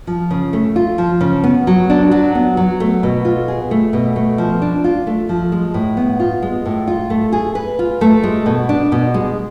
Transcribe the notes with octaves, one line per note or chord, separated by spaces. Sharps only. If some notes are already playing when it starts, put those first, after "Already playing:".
F3
C#3
A3
F4
F3
C#3
B3
F#3
D4
F#3
B3
F#3
A3
B2
F4
G#4
A3
B2
A3
F3
D4
F4
A3
F3
G#3
A2
B3
F4
G#3
A2
F4
A3
G#4
B4
F4
A3
G#3
B2
D4
B2
G#3